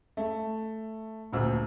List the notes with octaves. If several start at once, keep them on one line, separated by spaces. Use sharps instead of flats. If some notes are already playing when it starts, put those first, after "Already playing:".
A3
D#1 D2 E6